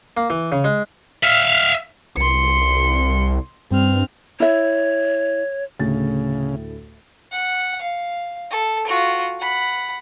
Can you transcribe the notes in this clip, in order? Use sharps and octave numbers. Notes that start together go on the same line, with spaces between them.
A#3
E3
C#3
G#3
E5 F5
C2 C6 C#7
G2 C4 F6
E4 C#5 E5
D2 A2 C#3 A6
F#5
F5
A4
F4 F#4
F#5 B5